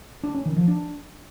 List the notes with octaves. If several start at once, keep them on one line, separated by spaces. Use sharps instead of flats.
D4
C#4
D#3
F3
D4